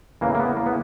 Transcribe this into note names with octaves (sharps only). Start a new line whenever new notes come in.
E2 C#3 E3 A#3
A#3
B3
A#3
B3